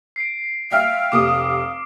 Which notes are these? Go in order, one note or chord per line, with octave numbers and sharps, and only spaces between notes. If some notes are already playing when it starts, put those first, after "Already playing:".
C7 D7
E5 F5 G5 F6
F1 G4 D6 D#6